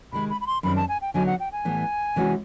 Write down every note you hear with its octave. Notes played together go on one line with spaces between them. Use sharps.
C3 D#3 G#3 B5
B5
B5
C6
F#2 D#3 G3 C4 B5
A5
G#5
G5
D3 F#3 B3 D#4 G#5
F#5
G5
G#5
A2 E3 G3 B3
C3 E3 G#3 C#4 F#4